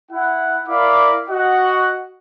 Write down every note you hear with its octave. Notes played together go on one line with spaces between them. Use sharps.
E4 F#5
E4 A#4 D5 F5 B5 D6
F#4 D#5 F#5